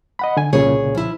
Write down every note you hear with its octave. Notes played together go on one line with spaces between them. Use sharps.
D#5 F#5 B5
D3 G#5
C2 A#2 C#3 G#4 C#5
F3 E4